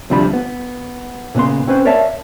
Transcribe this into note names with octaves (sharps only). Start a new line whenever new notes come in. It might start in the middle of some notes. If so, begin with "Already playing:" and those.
D2 C3 F3 G3 D4 B5
B3
A#2 C#3 B3 B4 C6
C4 C#4 B4 C5
A#4 C#5 D5 E5 F5 A5